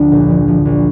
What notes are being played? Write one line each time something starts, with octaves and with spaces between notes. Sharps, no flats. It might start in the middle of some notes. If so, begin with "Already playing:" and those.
Already playing: D2 F3 D4
A#1
F3
F3
A#1